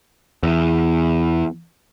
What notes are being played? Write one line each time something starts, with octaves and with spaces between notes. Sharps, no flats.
E2